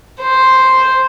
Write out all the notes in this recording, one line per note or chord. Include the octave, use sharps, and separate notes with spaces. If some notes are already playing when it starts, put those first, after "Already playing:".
C5